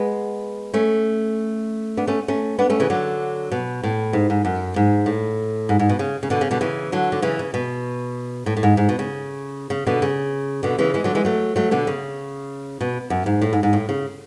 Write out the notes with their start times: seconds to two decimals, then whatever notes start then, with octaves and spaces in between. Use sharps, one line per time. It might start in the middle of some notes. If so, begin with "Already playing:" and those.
Already playing: G#3 B3
0.74 A3 C#4
1.97 B3 D4
2.07 A3 C#4
2.28 A3 C#4
2.59 B3 D4
2.70 A3 C#4
2.80 C#3 E3
2.90 D3 F#3
3.52 B2
3.83 A2
4.13 G#2
4.30 G#2
4.45 F#2
4.76 G#2
5.06 A2
5.69 G#2
5.79 G#2
5.89 B2
5.99 C#3
6.23 C#3
6.30 B2 D3
6.41 C#3
6.51 B2 D3
6.61 C#3 E3
6.92 D3 F#3
7.12 D3
7.22 C#3 E3
7.39 C#3
7.54 B2
8.46 A2
8.57 A2
8.63 G#2
8.77 G#2
8.89 B2
8.99 C#3
9.70 C#3
9.87 B2 D3
10.02 C#3
10.63 B2 D3
10.78 C#3 E3
10.94 E3 G#3
11.04 D3 F#3
11.15 E3 G#3
11.25 F#3 A3
11.56 F#3 A3
11.71 B2 D3
11.87 C#3
12.81 B2
13.10 F#2
13.26 G#2
13.41 A2
13.53 G#2
13.63 G#2
13.73 A2
13.89 C#3